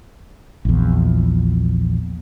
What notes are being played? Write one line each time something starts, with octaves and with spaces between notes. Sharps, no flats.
A#1 E2